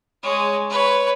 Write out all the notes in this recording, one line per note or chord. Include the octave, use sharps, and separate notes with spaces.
G#3 C#5
B4 C#5